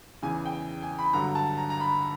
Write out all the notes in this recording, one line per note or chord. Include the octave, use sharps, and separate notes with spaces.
E2 C#3 E3 G#5
G5
G#5
B5
G2 D3 F#3 A#5
A5
A#5
A#5
B5